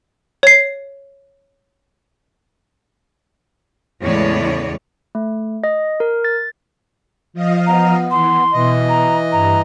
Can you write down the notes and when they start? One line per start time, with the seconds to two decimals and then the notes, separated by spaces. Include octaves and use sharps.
0.43 C#5 C7
4.01 E2 A2 C#3 G#3 C#5 D5
5.15 A3
5.64 D#5
6.00 A#4
6.25 A6
7.34 F3 D#5 F5
7.67 B3 A#5
8.11 E3 C6
8.53 B2 E3 D#5
8.89 A#5
9.32 G2 A#5